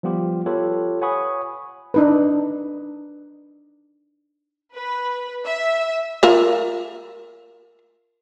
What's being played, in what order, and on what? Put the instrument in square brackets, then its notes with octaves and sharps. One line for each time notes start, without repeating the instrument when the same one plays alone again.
[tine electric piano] F3 G3 B3 F4 G4
F4 G4 A4 B4 C#5
C#5 F#5 G#5 B5 C#6 D#6
[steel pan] D4 D#4 B4
[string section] B4
E5
[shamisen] F4 A#4 E5